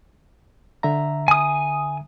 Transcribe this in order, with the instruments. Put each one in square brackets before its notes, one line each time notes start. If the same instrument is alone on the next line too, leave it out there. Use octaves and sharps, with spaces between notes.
[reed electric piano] D3 E5 A#5
[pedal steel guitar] G#5 D#6